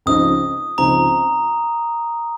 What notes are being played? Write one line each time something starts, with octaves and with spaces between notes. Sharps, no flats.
C#2 C#3 F3 C4 D#4 D#6
C#2 C#3 F3 C4 D#4 A#5